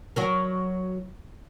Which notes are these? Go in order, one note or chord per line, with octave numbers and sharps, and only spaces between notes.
F#3 F#4 A#4